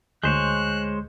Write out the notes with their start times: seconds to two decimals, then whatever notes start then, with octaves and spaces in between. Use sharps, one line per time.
0.24 D2 G#3 C5 C#5 F#6 G6